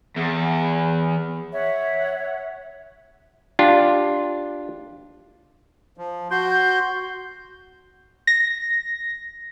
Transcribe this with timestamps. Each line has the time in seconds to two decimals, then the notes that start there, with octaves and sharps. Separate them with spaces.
0.17 E2
1.53 C#5 E5 F#5
3.59 D4 F4 G4
5.98 F3
6.31 F#4 C6 G6
8.27 A#6